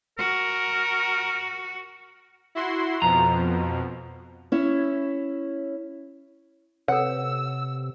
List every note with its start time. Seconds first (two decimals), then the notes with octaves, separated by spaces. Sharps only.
0.18 F#4 A#4
2.55 E4 F#4 C6
3.02 F2 B2 F3 A#5
4.52 C#4 E4 C#5
6.88 C3 A4 B4 C#5 F#5 E6